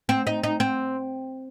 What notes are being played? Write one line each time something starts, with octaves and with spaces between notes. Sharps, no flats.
C4
D#4
D#4
C4